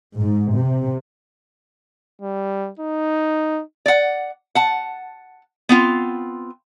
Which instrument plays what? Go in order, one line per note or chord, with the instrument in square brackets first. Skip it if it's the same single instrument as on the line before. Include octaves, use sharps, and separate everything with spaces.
[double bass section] G#2
C3
[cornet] G3
D#4
[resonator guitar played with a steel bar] D5 F#5
F#5 A5
B3 C4 F4